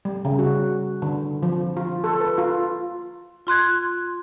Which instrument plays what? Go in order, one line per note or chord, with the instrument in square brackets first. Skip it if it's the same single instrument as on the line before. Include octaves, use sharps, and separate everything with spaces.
[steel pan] G3
C#3
F#4
D3
F3
F4
A4
B4
F4
[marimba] F4 C6 F#6 G#6